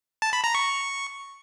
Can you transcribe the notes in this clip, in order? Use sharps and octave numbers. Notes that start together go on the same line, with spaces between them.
A5
B5
A#5
C#6